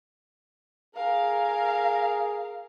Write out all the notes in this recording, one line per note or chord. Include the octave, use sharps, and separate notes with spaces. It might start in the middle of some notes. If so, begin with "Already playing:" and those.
G#4 A#4 F5